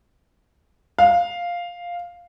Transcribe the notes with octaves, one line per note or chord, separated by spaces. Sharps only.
F5